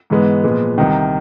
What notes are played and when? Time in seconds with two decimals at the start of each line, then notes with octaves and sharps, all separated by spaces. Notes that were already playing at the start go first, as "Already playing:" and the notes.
0.10 G#2 E3 G#3 B3
0.44 A#2 F3 G#3 B3
0.78 C2 C3 D#3